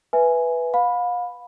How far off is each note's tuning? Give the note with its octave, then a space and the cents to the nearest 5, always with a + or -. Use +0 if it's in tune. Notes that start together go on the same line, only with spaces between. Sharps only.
B4 +0 E5 +0 G#5 +0
F5 +35 B5 +0